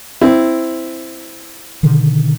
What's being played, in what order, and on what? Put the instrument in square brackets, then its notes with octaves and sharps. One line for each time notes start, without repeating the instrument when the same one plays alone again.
[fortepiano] C4 E4
[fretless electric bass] B2 D3 D#3